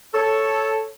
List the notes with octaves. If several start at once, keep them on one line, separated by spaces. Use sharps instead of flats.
A4 C#5